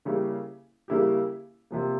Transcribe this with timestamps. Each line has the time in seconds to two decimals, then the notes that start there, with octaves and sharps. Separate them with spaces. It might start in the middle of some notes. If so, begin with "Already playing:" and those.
0.05 C#3 G3 A#3 E4 G4
0.88 C#3 G3 A#3 E4 G4
1.71 C3 F3 A#3